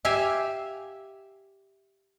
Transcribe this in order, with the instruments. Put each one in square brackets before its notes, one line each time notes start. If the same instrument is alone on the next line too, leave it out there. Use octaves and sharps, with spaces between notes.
[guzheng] G4 E5 F5 G#5